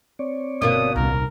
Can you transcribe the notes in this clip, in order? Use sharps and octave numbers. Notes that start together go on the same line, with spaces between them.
C4 C#5 D5
G1 B2 A#3 D4 D#6
D#1 C2 A#4